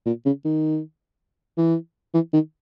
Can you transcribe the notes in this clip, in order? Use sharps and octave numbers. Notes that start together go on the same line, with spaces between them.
A#2
C#3
D#3
E3
E3
D#3